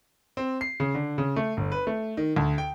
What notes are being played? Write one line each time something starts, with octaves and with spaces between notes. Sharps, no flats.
C4
C7
C#3
D3
C#3
A3
G1
B4
A3
D#3
D2
G5